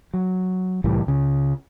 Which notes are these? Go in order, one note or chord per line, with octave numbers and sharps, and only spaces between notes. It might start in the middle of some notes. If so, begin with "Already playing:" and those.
F#3
C2 A2 E3 G3
C#2 C#3